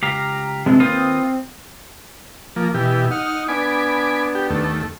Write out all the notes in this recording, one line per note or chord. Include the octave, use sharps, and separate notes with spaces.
C#2 G4 F5 A#5
C3 E3 G#3 C4 D4
D#2 A#3 C4 F4 B4 D#6
F3 A#3
B2 E3 G4
D#4 F#5 F6
B3 D4 G#5 B5 D6
G4
D#2 A3